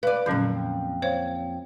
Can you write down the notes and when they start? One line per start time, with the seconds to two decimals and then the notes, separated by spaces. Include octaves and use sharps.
0.03 B4 D5 F5
0.26 F2 A#2 D3 F#3 C#4
1.02 C5 C#5 F5